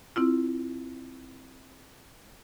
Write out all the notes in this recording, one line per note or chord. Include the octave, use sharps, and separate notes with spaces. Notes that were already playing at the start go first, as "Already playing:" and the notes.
C4 E4 F4